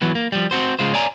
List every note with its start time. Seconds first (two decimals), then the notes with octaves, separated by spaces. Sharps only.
0.02 E3 F#3 B3
0.15 A#3
0.32 F3 G3
0.51 C4 F#4 C5
0.79 C#3 G#3 F4 C5
0.94 C#5 D5 G#5 A#5